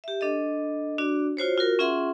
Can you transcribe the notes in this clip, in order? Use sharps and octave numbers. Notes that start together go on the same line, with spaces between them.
G4 E5
D4 A4 D#5
D4 F#4 D5
F4 F#4 C5 C#5
F4 F#4 A#4
C#4 F4 G#4 E5 F#5 C6